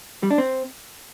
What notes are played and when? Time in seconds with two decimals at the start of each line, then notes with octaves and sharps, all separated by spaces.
0.23 G3
0.31 D4
0.38 C4